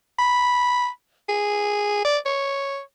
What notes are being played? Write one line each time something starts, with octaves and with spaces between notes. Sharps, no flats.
B5
G#4
D5
C#5